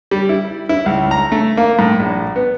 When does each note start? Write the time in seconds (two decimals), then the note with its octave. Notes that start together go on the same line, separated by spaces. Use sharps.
0.11 G3
0.29 E4
0.69 E4
0.86 C#2
1.11 A#5
1.32 A3
1.57 A#3
1.79 A2
1.99 A#1
2.36 B3